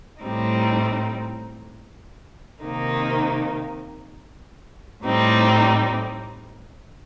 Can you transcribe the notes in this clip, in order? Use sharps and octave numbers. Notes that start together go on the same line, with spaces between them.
A2 G3 C4 D#4
C3 D#3 A#3 D#4
A2 G3 C4 D#4